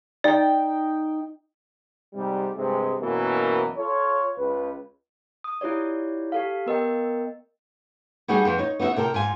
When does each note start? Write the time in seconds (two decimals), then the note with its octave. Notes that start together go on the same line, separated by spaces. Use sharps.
0.24 D#4 D5 G5
2.14 G#2 C3 G3
2.57 G2 C3 G#3
3.01 F#2 B2 E3 F#3 A#3
3.77 F4 A4 C#5
4.38 C#2 B4
5.44 D#6
5.61 E4 F4 G4 C#5 D5
6.32 G4 A4 F5
6.66 B3 A#4 D#5 G5
8.28 F#3 G3 D#4 F#4 G#4
8.45 F2 B3
8.58 D#4 C#5
8.80 B3 D#4 E4 F#4 E5
8.96 C3 A4 A#4 G5
9.14 G#2 F4 G#5